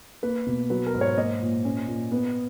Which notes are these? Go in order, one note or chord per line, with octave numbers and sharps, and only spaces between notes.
A#3 B4
B2
F#3 B4
A#4
G#2
C#5
A#3 D#5
A#2
C#4
A#2
B3